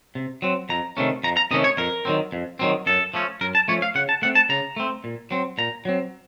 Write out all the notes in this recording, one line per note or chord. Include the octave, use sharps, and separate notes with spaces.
C3
F#3 C4
F2 A#5
C3 D#3 A3 C#4
F2 A#5
A#5
C3 D#3 A3 C#4 D#5
C#5
F2 A#4
D#3 F#3 C4
F2
D#3 F#3 C4
F#2 A4
F3 A3 C#4
F#2 A#4
A5
F3 A3 C#4 C#5
F5
C#3 F#5
A5
A3 C4 F#5
A5
C#3 A#5
A3 C4
A#2
F#3 C4
A#2 A#5
F#3 C4